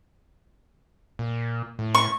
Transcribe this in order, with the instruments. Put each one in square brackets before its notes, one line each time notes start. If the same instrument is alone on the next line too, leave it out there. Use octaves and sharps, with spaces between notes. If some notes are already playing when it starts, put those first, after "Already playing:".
[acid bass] A#2
A2
[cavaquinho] C#6